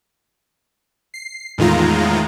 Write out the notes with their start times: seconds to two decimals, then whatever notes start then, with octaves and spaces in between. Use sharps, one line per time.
1.14 C7
1.58 E2 A2 D#3 G#3 F4 A#5